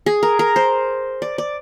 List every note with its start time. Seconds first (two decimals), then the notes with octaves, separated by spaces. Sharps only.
0.06 G#4
0.23 A#4
0.39 A#4
0.56 C5
1.22 D5
1.38 D5